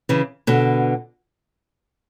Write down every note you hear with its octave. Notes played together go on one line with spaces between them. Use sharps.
C#3 E3
B2 D3